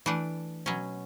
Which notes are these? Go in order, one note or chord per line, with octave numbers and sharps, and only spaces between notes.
E3 A3 D4
B2 F#3 C#4